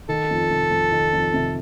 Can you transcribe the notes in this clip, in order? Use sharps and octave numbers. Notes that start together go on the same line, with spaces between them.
D#3 A4
F2
C3
F2
D#3
F2
C3